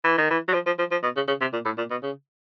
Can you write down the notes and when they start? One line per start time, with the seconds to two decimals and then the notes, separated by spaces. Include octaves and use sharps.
0.04 E3
0.18 D#3
0.31 E3
0.48 F#3
0.54 F3
0.66 F3
0.79 F3
0.91 F3
1.03 B2
1.16 C#3
1.28 C#3
1.41 C3
1.53 A#2
1.65 A2
1.78 A#2
1.90 B2
2.03 C#3